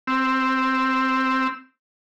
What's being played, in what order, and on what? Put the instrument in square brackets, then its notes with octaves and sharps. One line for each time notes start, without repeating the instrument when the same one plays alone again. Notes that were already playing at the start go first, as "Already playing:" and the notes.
[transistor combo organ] C4 E6